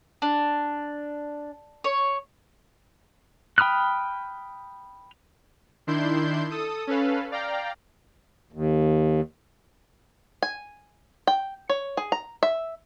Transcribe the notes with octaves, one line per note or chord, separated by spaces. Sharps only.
D4
C#5
G5 B5 D#6 F6 F#6
D#3 D4 E4 C6 G6
A4 D#6
C#4 A4 B4 F5
D5 F5 G5 A#5
D#2
G#5
G5
C#5
G#4
A#5
E5